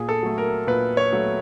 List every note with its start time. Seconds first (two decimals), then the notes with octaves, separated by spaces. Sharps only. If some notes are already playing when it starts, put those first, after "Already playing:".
Already playing: A#2 G#4
0.09 A4
0.23 F#3 A3
0.38 A#4
0.67 A#2 B4
0.97 C#5
1.13 F#3 A3